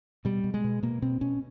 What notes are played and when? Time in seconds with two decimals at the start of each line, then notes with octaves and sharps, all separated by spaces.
0.25 B2 G3
0.44 B2
0.54 G#3
0.64 B2
0.83 B2 A#3
1.02 B2 C4
1.21 B2 C#4